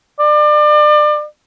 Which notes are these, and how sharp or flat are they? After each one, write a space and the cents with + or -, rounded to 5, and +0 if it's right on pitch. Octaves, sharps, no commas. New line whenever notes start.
D5 +30